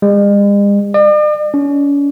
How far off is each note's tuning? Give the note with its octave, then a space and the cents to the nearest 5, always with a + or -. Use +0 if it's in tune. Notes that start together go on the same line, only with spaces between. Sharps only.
G#3 -45
D5 +45
C#4 +40